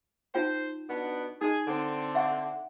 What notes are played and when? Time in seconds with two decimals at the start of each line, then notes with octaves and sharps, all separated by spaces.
0.35 D#4 F4 C5 G5
0.89 B2 B3 D4
1.42 D#4 G#4
1.67 D3 C4
2.15 E5 F#5 C#6